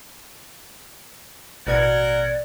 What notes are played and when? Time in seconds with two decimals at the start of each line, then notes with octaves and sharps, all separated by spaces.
1.67 A1 B2 A#4 D5 F#5 G#6